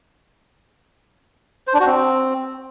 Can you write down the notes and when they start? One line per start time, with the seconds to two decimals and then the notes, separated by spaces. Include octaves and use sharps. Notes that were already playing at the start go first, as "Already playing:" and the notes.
1.67 C5
1.74 D4
1.80 F#4
1.86 C4